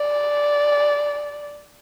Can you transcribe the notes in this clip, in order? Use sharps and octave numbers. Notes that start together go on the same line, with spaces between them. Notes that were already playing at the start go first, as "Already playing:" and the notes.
Already playing: D5